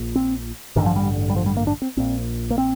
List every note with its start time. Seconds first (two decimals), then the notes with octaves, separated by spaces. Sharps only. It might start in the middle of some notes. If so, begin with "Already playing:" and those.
Already playing: A#1 A#2
0.16 C4
0.76 A1 G2 D3 D#3
0.86 F3
0.96 G3
1.30 G3
1.36 F3
1.46 G3
1.57 A#3
1.67 D4
1.82 C4
1.97 A#1 A#2 C4
2.51 A#3
2.58 C4